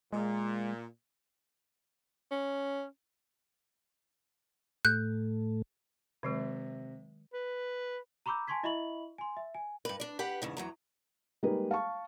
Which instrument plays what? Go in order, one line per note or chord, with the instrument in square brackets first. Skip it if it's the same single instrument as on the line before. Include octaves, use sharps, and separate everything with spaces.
[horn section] A#2 [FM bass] G#3
[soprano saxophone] C#4
[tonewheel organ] A2 A3 [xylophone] F#6 G6
[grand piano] C3 [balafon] D#3 F#3 G#3
[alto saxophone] B4
[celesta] A#5 B5 C#6 D6 E6 G6
G#5 A5 C6 C#6 G#6 B6
E4 D#5 E5 B5 C#6 F#7
G#5 C6
E5
G#5
[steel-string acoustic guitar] G2 B4
D4 D5
G4 B4 F#5
E2 G#2 C#3
E2 F#3 A#5
[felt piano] G3 G#3 A#3 D#4 G#4 B4
F5 A5 C#6